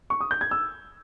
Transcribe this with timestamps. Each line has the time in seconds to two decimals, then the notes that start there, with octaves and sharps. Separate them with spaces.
0.10 C#6
0.21 D#6
0.31 G6
0.41 G#6
0.51 E6